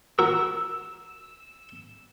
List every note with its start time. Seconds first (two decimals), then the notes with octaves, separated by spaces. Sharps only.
0.19 F#4 A#4 E6